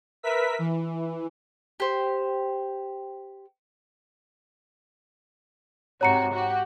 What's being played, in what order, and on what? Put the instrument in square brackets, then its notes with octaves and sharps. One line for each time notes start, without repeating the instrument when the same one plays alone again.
[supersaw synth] A#4 B4 E5 B6
E3
[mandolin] G4 C5
[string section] G#2 C3 F#4 [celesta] C#5 A#5 C#7
[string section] F#4 G4